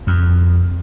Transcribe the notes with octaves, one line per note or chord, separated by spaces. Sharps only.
F2